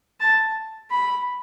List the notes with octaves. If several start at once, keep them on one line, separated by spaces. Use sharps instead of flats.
A5
B5